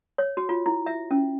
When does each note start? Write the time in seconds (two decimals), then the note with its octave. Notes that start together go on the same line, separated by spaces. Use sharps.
0.18 C#5
0.37 F#4
0.49 F4
0.66 E4
0.86 E5
1.11 C#4